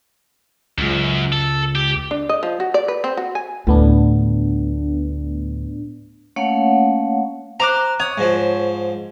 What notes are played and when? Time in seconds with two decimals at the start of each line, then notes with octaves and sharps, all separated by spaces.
0.78 C#2 F#2
1.32 A4
1.75 G4
2.11 D4
2.29 D#5
2.43 F3
2.60 F#4
2.74 D5
2.88 B4
3.04 C4
3.17 F#4
3.35 G#5
3.67 D2 A2 B3 D4
6.36 A3 A#3 C#4 C#5 F5 F#5
7.60 C5 A#5 D6 F#6
8.00 C#5 D#6
8.18 G#2 F3